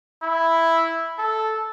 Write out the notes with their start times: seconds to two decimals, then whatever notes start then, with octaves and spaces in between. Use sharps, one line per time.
0.23 E4
1.18 A4